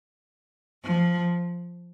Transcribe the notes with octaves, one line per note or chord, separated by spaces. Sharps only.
F3